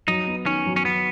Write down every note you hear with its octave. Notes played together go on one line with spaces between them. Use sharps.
F#3 D#4
B3
D#3 C#4
F#3
C#4
F#3 B3